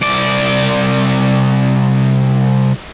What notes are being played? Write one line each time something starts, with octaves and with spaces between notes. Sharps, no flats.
C2 D5